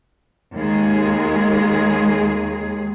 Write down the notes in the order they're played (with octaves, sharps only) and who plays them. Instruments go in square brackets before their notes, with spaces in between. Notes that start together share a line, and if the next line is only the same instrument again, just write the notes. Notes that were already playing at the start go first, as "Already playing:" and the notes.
[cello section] D#2 G#3 G#4